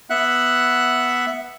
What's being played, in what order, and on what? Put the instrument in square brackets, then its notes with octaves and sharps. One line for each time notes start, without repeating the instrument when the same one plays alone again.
[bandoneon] B3 E5 F#5 F#6